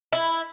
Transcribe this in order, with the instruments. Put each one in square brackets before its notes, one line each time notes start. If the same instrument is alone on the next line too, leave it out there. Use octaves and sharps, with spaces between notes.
[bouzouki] E4